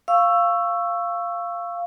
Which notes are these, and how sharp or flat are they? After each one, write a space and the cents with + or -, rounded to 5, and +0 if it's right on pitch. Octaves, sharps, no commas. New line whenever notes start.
F5 -5 C#6 +0 E6 +10